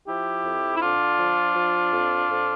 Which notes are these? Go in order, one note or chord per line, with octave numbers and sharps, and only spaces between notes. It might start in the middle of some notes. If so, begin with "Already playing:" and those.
F3 E4 G4
F2
E4
D3 D4 F4
F3
F3
F2
F2